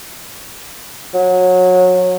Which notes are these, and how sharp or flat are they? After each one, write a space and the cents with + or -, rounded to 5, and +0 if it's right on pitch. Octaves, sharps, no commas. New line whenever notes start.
F#3 -20